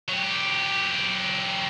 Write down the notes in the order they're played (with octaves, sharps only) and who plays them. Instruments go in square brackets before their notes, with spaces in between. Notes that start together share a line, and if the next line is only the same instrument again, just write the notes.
[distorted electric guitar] F#3 G4